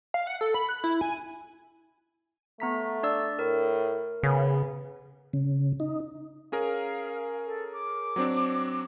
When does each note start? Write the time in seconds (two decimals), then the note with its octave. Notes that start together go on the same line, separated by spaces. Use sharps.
0.14 F5
0.27 F#5
0.41 A4
0.54 B5
0.69 F#6
0.84 E4
1.01 G#5
2.60 A3 B3 A#5 B6
3.03 D4 D5 E6
3.39 A2 A#4
4.23 C#3 B3
5.33 C#3
5.80 D#4
6.52 C#4 G#4 A#4 F5
7.46 A4
7.73 D6
8.16 F#3 C4 D4